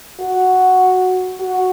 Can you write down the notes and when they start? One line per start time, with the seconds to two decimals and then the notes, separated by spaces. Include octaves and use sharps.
0.20 F#4
1.41 F#4